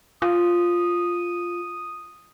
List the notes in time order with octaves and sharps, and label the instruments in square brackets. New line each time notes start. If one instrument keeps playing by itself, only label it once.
[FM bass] F4 [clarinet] D#6